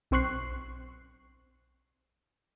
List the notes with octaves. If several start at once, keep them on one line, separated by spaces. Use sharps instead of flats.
B1 C4 C5 C#6 F#6 C7